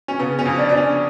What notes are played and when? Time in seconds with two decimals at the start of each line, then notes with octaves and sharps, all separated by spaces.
0.08 C#4
0.19 C#3 B3
0.39 C#4
0.45 F2
0.58 D4
0.69 F2 D4
0.77 C#4